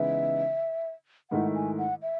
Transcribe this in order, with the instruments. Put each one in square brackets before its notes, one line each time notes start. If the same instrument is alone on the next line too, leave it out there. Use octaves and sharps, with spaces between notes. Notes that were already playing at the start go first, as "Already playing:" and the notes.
Already playing: [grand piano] C#3 E3 G#3 B3 D#4 [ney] E5
[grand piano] G#2 D#3 A3 E4 [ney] F#5
[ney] G#5
F#5
E5